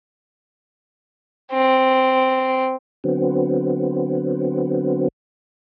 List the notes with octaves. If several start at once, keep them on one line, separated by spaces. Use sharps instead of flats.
C4
D3 F#3 B3 C4